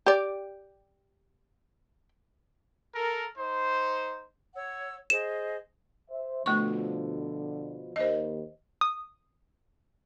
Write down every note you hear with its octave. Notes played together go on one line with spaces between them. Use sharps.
G4 D5
A4 A#4
D#4 C5
C#5 F#5 E6
G#4 C5 D#5 E7
C5 E5
B2 D3 F3 A3 C#6
D#2 C5 D#5
D#6